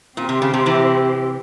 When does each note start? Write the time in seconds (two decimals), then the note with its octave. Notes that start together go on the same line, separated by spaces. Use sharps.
0.17 A#2 C4 G4 C5
0.29 C3
0.42 C#3
0.54 C3
0.66 C3 E3